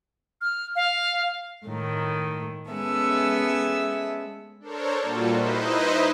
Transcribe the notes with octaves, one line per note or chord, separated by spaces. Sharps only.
F6
F5
A2 D#3
G#3 B3 C#4 G#4 A4 E5
D4 A4 A#4 C5 C#5
A#2 G3 A#3 F4 F#4 A4
D#4 E4 B4 C5 D#5